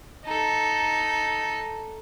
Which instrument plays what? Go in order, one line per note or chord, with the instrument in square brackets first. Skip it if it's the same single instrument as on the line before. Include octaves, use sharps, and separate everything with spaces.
[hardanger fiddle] D#4 A4